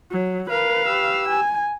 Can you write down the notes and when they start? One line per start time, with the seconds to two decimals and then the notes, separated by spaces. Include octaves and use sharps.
0.12 F#3
0.50 A#4 B4 F5
0.85 G4 E6
1.29 G#5